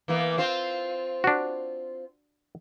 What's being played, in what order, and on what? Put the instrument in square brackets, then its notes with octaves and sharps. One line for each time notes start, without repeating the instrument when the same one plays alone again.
[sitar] E3 A#3 B3
C4 F4 C5
[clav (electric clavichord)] D4 F#4